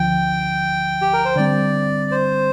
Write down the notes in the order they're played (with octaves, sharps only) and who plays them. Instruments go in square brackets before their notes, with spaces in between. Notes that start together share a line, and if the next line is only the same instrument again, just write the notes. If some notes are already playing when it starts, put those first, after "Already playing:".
Already playing: [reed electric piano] D2 D3 F3 [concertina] G5
[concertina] G4
A#4
C5
[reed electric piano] D3 G3 C4 [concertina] D5
[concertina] C5